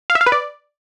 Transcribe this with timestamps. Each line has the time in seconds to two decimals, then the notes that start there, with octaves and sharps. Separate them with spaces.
0.10 F5
0.15 E5
0.21 F5
0.26 B4
0.32 D5